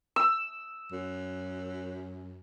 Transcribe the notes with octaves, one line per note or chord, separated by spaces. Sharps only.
E6
F#2